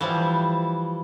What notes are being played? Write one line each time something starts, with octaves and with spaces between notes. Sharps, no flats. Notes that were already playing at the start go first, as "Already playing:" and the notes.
E3 F3 G3